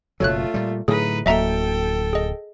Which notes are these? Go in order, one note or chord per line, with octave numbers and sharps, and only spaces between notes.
F#1 B2 F#3 A3 F4 A4 C#5 F#6
A#2 G3
A2 D3 F#3 D#4 G#4 B4
D1 F#3 A#3 A4 D#5 E5 G5 A#5
G#4 D#5